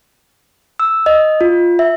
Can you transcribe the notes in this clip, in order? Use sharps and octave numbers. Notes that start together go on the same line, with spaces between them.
E6
D#5
F4
E5